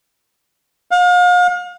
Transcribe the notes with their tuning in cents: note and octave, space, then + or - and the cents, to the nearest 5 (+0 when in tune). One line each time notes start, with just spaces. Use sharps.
F5 +40